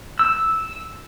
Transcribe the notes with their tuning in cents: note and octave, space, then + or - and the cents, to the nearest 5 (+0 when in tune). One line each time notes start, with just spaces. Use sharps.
E6 -5